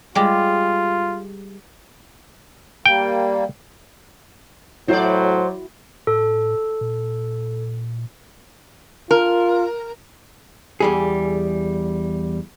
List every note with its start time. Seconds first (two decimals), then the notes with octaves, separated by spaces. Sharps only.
0.15 G3 G#3 F4 G4
2.86 G3 A#3 G5
4.88 A2 F#3 E4 F#4 C5 D5
6.07 A2 A4
6.81 A#2
9.11 F4 A#4
10.80 E2 G3 G#4